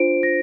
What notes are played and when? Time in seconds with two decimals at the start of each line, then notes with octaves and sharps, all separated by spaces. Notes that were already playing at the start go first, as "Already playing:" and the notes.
Already playing: D4 F4 C5 D7
0.23 A#6